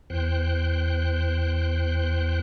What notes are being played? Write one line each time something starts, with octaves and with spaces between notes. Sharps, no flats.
E2 C5 G5 F#6